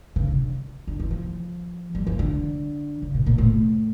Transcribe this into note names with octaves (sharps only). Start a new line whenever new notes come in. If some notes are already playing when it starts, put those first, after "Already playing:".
C#3
D3
D3
E3
F3
G3
F3
D3
C#3
A#2
A#2
A2